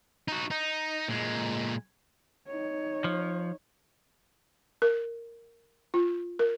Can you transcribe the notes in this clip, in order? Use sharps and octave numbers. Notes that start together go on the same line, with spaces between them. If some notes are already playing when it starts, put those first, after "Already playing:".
D#4 F#4
D#4
A#2 G#3
D#4 C#5
F3
A#4
F4
A#4